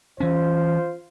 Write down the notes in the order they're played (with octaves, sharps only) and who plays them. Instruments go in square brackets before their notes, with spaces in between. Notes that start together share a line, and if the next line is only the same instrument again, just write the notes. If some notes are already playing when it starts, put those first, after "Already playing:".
[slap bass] E3 C#4 [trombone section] F4 C5